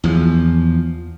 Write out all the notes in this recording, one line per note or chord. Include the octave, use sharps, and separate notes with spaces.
E2 F3